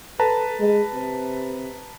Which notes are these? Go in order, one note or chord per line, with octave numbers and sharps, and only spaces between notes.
A4 B4 A5 A#5
G#3
C3